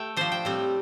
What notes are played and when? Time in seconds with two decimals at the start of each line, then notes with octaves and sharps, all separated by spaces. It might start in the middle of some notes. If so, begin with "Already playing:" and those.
Already playing: A3 G5
0.17 F3 D4 C5
0.32 G5
0.45 A2 G3 C4